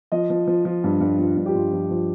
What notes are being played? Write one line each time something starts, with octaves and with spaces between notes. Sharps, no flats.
F3 D#5
F3
F3
F3
G2
G2
F3
G2
G4
G2 F4
F3
F3